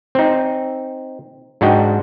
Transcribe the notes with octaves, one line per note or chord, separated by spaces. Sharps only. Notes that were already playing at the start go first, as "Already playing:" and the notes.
C4 D#4
G#2 D4 F#4 D#5 G5